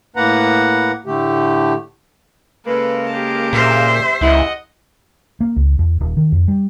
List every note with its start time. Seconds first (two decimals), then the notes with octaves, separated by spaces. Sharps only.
0.16 A2 A#3 B4 F#5 A#5
1.06 A2 D3 A3 G4
2.66 C#3 G#3 A#3 A4 B4
3.09 G4 A5
3.53 A#2 C5 E5
4.21 C#2 E4 D#5 F#5
5.41 A#3
5.56 C#2
5.79 E2
6.00 D#1
6.17 D#3
6.32 F2
6.48 G3